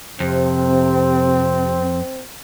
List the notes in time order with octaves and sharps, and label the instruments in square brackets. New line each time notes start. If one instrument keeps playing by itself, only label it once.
[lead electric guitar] F2 [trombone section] C3 [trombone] C4